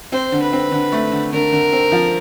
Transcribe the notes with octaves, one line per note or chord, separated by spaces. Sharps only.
C4 C5
D3
B4
C4
D3
A3
D3
D3 A#4
D3
C4
F3